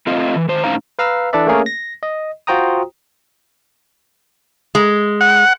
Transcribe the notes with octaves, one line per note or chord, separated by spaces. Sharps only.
A3 C4 F4 D#5 F5
E3
D#3 C5
A2 C#4 D#4 C5 F5 A#5
B4 F5 A#5 E6
E3 D4 A4 B4 D5 E5
A3 A#3 C#4 G#4 A#4 C#5
A#6
D#5
F4 F#4 C5 G5 A#5 D#6
G#3
F#5